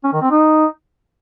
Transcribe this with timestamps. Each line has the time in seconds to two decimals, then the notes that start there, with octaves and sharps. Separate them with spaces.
0.04 C#4
0.13 D#3
0.22 C4
0.31 D#4